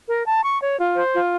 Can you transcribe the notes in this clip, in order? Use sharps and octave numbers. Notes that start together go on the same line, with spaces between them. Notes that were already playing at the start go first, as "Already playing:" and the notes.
A#4
A5
C#6
C#5
F4
C5
F4